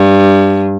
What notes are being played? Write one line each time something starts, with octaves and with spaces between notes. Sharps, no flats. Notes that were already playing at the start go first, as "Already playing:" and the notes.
Already playing: G2